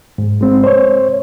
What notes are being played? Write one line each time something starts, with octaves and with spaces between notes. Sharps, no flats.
G#2
G#3 C4
C5 C#5